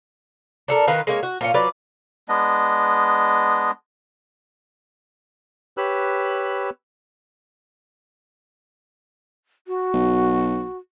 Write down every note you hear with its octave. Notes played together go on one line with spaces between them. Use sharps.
D4 A4 A#4
D#3 F4 A#4 B4
G#3 A#3 C#5
F#4
A#2 F4 C#5
F#3 F4 B4 D5
G#3 B3 D4 D#5
G4 B4 C#5 B5 E6 F#6
F#4
B1